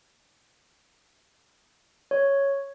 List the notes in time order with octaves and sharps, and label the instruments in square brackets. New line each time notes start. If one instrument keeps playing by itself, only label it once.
[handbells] C#5